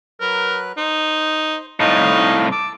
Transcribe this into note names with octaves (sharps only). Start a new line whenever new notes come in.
F#3 A#4 B4 F#6
D#4 C5
C2 A2 D#4 D#5 F5
A5 D6 E6